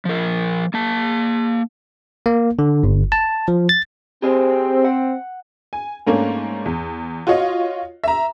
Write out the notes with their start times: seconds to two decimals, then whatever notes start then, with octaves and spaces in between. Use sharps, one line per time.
0.05 F3 A#4
0.74 A#3 A5
2.26 A#3
2.59 D3
2.83 G1
3.12 A5
3.48 F3
3.69 A6
4.22 C4 G4 G#4 D#5
4.85 F#5
5.73 G#5
6.07 G#2 A3 A#3 C#4 D4
6.66 E2
7.27 F4 F#4 C#5 D#5 F5
8.04 E5 A#5